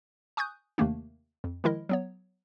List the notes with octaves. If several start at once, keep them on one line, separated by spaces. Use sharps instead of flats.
G#5 C#6 D#6 F#6 G6
D#2 C3 D#3 A3 A#3 D4
F2
D#3 F3 G#3 E4 A#4 D#5
F#3 B3 C#5